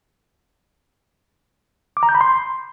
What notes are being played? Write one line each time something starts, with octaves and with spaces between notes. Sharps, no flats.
D6
A#5
G6
B5
C6